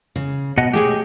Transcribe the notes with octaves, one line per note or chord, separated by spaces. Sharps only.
C#3
B2 D#5 F#5
A3 G4 G#4 C#5